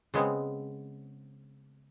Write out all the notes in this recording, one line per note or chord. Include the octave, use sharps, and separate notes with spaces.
C#3 G#3 B3 C4